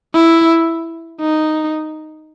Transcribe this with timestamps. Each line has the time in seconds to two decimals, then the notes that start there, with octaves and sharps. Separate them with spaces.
0.14 E4
1.21 D#4